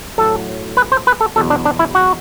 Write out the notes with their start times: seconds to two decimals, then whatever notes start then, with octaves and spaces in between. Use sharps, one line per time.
0.18 A2 F#3 A4
0.77 B4
0.92 C5
1.07 B4
1.21 A4
1.36 E2 B2 F#3 A4
1.50 D4
1.65 D4
1.79 E4
1.95 F#4